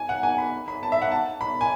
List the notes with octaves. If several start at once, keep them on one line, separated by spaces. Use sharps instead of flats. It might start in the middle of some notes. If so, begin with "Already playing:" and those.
Already playing: G#5
F#5
G#5
B5
B5
A5
E5
F#5
A5
B5
G#5